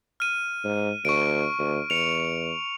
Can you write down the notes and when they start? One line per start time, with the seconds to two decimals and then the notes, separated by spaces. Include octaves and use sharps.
0.20 F6 D#7
0.64 G#2
1.05 D2 C#6 D7
1.58 D2
1.90 E2 C#7 F7